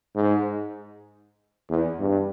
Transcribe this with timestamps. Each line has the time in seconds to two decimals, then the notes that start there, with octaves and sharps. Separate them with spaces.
0.16 G#2
1.70 E2
2.00 G2